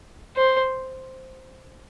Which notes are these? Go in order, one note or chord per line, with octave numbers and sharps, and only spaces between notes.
C5